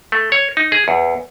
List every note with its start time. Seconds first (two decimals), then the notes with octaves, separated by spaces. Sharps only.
0.12 A3
0.32 C#5
0.57 D#4
0.72 G#4
0.88 E2